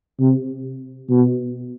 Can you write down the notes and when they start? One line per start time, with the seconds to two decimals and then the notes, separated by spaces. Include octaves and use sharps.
0.20 C3
1.09 B2